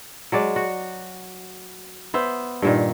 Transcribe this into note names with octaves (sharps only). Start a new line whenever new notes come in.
F#3 G#3 D5
F#4
B3 C5 E5
G2 A#2 D#3